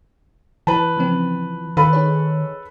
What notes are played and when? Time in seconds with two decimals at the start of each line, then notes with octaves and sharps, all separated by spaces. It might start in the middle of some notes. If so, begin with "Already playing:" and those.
0.67 E3 B4 A5
0.97 C#3 F3 C4
1.77 D#3 A4 B4 F5 B5
1.93 D#4 G#4 C#5